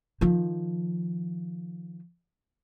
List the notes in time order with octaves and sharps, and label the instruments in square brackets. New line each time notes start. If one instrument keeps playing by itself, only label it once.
[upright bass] D#3 F3